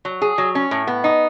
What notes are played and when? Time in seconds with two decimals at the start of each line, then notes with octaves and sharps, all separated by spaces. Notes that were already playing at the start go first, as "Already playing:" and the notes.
0.05 F#3
0.22 G#4
0.38 F#3
0.55 C#4
0.71 A2
0.87 B3
1.04 D#4